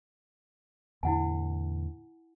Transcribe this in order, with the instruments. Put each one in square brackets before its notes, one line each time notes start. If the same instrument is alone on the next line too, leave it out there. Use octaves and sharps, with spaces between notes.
[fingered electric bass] E2 A2 D3 [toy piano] E4 F#5 G#5